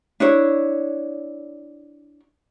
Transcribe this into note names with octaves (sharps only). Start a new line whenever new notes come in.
D4 E4 C#5